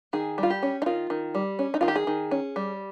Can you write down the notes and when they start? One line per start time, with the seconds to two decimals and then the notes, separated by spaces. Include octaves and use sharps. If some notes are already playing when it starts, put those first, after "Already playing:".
0.13 D#3 G#4
0.38 G3
0.43 F4
0.50 G4
0.63 C#4
0.82 D#4
0.86 D#3 F4
1.10 D#3
1.35 G3
1.59 C#4
1.74 D#4
1.81 D#3 F4
1.88 G4
1.96 G#4
2.07 D#3
2.31 C#4
2.56 G3